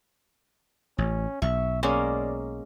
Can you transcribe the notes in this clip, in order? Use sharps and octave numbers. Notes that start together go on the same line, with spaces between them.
A1 C#4
B1 E5 C#6
G#3 A#3 C#4 D5